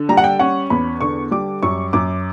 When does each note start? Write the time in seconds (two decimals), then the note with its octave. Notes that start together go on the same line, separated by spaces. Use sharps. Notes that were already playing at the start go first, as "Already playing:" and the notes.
Already playing: D3
0.09 G3 A#5
0.17 F#5
0.24 G5
0.39 C#4 F#5
0.70 E2 B5
1.01 D3 C#6
1.31 G3 D6
1.63 F#2 C#6
1.93 F#2 D6